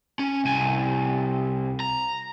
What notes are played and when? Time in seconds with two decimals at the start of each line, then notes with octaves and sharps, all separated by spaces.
0.19 C#4
0.45 C2 G#5
1.80 A#5